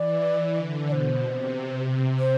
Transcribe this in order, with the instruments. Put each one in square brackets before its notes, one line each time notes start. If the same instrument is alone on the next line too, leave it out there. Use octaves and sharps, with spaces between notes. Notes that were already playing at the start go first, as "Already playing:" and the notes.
Already playing: [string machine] E3 [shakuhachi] D5
[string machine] D3
[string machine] B2 [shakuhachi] D5
[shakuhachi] C5
[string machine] C3
C3
[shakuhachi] C5